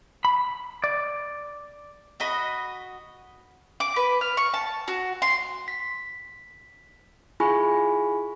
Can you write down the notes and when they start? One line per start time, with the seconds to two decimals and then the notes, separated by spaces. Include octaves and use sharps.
0.25 B5
0.84 D5
2.20 F#4 D#5 B5
3.80 D6
3.96 B4
4.21 F6
4.37 C#6
4.54 A5
4.88 F#4
5.22 C6
5.68 B6
7.40 E4 F4 G#4 G#5 B5 C#6